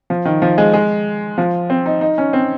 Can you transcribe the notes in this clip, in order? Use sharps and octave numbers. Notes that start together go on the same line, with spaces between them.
F3
D#3
F3
G#3
G#3
F3
C4
D#4
D#4
C#4
C4